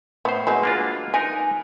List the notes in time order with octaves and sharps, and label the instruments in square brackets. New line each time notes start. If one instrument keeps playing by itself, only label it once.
[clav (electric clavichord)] A2 C5 [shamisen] B3
[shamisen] F#3 G#3 B3
[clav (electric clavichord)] A#3 D4 F4
[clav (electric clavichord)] D#4 A#4 B4 [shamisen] G#5